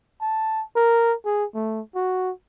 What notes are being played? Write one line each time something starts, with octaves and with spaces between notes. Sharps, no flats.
A5
A#4
G#4
A3
F#4